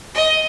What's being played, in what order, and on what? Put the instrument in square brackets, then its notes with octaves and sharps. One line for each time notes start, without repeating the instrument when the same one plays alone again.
[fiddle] D#5